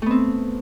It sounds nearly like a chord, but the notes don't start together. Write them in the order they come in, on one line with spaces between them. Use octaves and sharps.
A3 B3 C4